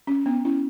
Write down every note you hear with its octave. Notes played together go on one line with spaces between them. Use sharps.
C#4
B3 D4
C#4 E4